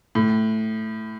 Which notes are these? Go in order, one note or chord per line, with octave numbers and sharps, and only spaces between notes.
A2